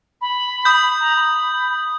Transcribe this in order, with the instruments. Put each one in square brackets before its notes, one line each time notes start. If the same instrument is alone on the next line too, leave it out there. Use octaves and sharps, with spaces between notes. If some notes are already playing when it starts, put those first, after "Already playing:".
[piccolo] B5
[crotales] D#6 G6
[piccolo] A#5
B5